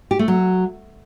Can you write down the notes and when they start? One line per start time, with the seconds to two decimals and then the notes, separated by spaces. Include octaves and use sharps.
0.11 G4
0.19 A3
0.28 F#3